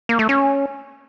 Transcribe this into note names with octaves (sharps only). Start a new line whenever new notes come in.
A#3
A3
C#4